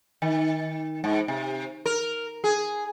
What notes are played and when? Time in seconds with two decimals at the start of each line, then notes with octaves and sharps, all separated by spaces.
0.22 D#3
1.04 G#2
1.28 C3
1.86 A#4
2.44 G#4